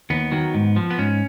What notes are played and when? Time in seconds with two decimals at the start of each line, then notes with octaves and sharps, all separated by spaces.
0.10 D#2 B3
0.32 D#3 F#3
0.54 G#2
0.76 F3
0.90 B3
0.98 G#2 C#4